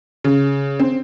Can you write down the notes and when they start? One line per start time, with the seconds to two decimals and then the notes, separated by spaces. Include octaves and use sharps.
0.24 C#3
0.80 C4